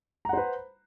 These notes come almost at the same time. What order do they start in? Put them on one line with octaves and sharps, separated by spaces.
A#5 F#5 C5 B4